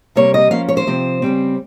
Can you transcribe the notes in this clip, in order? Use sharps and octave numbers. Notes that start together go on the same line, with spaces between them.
C3 G3 A#3 C#5
D#5
F3 A#3 C#4 F5
C#5
C5
C3 F3 C4
C#3 G3 C4